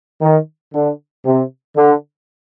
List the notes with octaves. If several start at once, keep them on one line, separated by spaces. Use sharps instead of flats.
D#3
D3
C3
D3